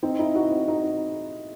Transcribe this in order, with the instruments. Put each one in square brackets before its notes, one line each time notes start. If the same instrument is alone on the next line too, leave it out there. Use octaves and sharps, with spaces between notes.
[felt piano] C4 [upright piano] D#4
[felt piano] D#4 [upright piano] E4
[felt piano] D#4 [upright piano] F#4
[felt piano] C4
D#4
D#4